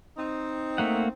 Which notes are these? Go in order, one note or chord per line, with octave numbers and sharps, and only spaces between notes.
C4 D#4
A3 A#3 F#5